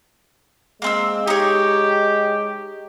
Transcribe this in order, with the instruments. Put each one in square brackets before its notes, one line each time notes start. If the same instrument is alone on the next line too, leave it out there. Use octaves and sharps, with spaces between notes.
[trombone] G#3 [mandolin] A#3 C4 E6
[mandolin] D#4 C#5 [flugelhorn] G4